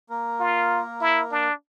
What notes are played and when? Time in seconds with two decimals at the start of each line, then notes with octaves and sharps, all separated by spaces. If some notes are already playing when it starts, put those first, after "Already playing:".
0.10 A#3 A#4
0.40 F4
1.01 E4
1.32 D4